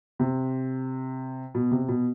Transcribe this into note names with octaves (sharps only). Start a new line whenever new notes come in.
C3
B2
C3
B2